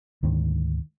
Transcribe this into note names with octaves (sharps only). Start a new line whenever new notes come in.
D2 G#2 D#3